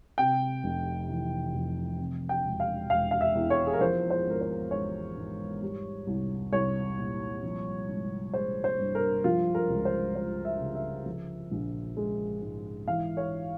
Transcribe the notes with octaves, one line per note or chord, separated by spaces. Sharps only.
C3 G5
F1
E3
F2
C3
G5
E1
F5
E1 F5
F5
E5
E2
C#5
G#4
A#4
F3 C5
C5
G#1 A#4
C5
G#1 C#5
G#2
G3
C2
C2 C#5
A#2
F3
G#1
G#3 C5
C5
G2
A#4
F3 F4
A#4
C#2
C5
G#3 C5
E5
C#3
E5
F3
A#1
G#3
G#2
E3 F5
C#5